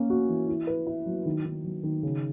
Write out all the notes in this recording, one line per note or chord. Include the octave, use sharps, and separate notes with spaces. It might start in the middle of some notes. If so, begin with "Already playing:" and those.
Already playing: A#3 C#4
F#4
E3
E4
B4
E4
F#3
D#3
D#3
F#3
D#3
C#3